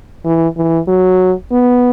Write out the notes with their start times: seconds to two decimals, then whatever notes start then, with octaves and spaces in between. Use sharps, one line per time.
0.25 E3
0.57 E3
0.88 F#3
1.52 B3